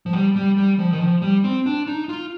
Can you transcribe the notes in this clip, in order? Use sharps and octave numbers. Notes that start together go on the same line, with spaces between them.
F3
G3
G3
G3
F3
D#3
F3
G3
C4
D4
D#4
F4